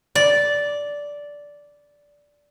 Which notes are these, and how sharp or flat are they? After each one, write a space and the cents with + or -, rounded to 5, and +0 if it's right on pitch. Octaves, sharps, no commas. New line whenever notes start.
D5 -10